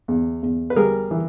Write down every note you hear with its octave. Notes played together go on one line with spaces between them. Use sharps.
E2
E2
B4
G3 G#4 A#4
E3